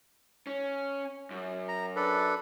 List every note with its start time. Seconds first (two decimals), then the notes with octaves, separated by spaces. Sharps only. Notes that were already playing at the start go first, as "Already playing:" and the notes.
0.47 C#4
1.31 F#2
1.68 A#5
1.96 D4 A4 B4